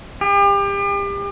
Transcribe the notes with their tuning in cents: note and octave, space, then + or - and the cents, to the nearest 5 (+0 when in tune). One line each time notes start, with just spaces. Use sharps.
G4 +35